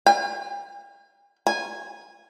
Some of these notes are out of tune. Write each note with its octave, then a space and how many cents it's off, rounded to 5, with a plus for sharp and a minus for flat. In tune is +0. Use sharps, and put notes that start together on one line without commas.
G#5 -45
G#5 -10